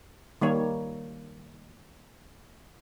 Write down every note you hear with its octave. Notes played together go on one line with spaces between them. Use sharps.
D#3 G3 A#3 C#5